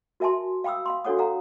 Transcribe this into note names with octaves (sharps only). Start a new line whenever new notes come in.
F#4 A#4 E5 G#5 A5 C6
F5 G5 B5 D#6 E6
F5 B5 C6
D4 F#4 A4 C#5 F#5 D#6
A4 F5 F#5 A#5